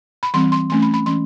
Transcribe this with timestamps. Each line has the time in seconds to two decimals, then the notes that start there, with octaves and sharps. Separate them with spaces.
0.23 B5
0.34 E3 G3 C4 C6
0.52 C6
0.70 E3 A3 C#4 C6
0.82 B5
0.94 B5
1.06 E3 G#3 C#4 C6